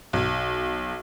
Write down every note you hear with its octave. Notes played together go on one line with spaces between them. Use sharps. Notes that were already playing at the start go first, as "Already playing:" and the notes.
B1